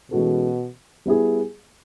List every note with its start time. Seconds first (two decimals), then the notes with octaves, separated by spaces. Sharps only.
0.11 B2 E3 G#3 C#4 F#4 A4
1.06 G3 B3 E4 G#4